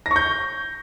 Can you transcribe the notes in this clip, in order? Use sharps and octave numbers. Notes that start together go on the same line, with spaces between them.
A#6
C#6
G6